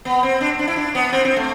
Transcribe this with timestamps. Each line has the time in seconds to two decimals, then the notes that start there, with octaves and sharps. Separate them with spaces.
0.05 B3
0.23 C4
0.41 D4
0.59 D4
0.67 E4
0.76 D4
0.95 B3
1.12 C4
1.25 C4
1.36 A3